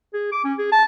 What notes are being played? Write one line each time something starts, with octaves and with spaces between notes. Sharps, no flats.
G#4
D6
C#4
G#4
A5